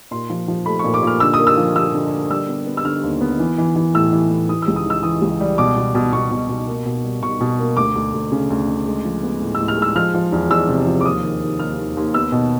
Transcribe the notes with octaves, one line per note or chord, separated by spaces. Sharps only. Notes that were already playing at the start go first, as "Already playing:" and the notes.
A#2 C6
F3
F3
A3 B5
A#2 C#6
D6
A#2 F6
D3 E6
D#6
A#3
E6
F3
F3 E6
D3
A#3
G3 E6
B3
B3
E6
D3 F6
D#2
B3
E3
E3
E3
A2 E6
E3
A2
E3 D#6
E6
C#2
D#6
E3 E6
E3 D#6
C#2
G3
B2 D6
B2
B2
B2 C#6
B2
B2
A#3
B2
G3
B2 C#6
B2
A#3
D2 D6
D2
D2
C#3
D2
C#3
G#3
F3
B3
A2
A2 E6
F6
G#3 E6
F3 F6
F3
E2
E2 E6
C3
F3
D6
D#2 D#6
D#3
D#3
D#2 F6
D#2
D#2
B3 E6
B2